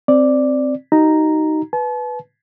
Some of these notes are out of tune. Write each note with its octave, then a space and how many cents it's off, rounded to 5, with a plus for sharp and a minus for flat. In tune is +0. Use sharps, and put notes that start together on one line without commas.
C4 +0 D5 +0
D#4 +0 F#4 +40 A#5 +0
B4 +0 A5 -40